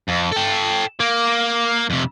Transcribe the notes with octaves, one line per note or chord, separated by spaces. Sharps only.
F2
A4 G5
A#3
F2 C3